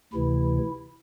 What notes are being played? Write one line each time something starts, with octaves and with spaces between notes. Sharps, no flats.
D2 C3 E3 E4